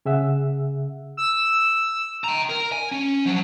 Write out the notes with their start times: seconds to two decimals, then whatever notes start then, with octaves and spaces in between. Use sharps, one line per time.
0.06 C#3 G#4 E5 F#5 E6
1.17 E6
2.24 G5 A#5
2.50 A#4
2.72 G#5
2.92 C#4
3.26 F3 F#3